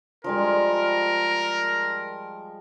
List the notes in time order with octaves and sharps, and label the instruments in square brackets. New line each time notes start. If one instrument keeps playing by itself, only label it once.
[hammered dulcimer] F3 G3 G#3 [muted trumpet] A#4